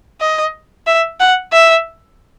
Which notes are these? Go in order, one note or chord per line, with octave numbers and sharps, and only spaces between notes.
D#5
E5
F#5
E5